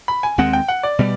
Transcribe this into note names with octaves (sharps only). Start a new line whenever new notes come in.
B5
G#5
D#2 D#3 G#3 C4 F#5
G5
F#5
D5
B2 G3